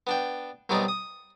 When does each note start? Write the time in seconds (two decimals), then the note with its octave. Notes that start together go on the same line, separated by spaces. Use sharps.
0.07 B3 D4 G5
0.69 C2 B2 F#3 B3 D#4 D5
0.88 D#6